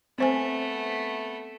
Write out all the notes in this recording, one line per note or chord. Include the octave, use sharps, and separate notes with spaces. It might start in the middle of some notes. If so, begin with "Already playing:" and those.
A3 B3 C4 C5 G#5